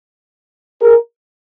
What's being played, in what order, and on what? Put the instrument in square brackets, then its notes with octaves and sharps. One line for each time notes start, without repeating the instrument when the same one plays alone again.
[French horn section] G#4 A#4